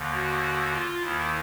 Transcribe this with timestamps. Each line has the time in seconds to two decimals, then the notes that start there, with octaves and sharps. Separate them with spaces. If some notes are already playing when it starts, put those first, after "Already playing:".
Already playing: D#2 D3
0.13 F#4
0.72 F4
1.00 D#2 D#3 E4